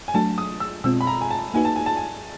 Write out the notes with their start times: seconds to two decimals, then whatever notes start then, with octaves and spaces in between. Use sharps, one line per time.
0.08 G#5
0.14 F#3 A3 D4 F#4 A5
0.38 D#6
0.60 E6
0.84 B2 G#3 C4 F4 E6
1.01 B5
1.07 A#5
1.21 G#5
1.31 A5
1.54 A#3 D#4 F#4 B4 G#5
1.65 A5
1.76 G#5
1.86 A5
1.97 G#5